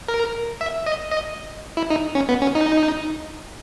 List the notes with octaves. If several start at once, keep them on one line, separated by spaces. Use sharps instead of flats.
A#4
E5
D#5
D#5
E4
D#4
C#4
B3
C#4
D#4